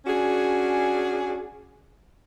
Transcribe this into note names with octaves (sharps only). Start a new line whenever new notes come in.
C#4 D4 F#4 G#4